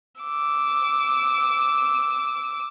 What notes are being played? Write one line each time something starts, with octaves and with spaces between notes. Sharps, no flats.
D6 E6